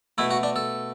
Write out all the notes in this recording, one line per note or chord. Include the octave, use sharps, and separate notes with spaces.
B2 A3 E4
F#4
D4
A4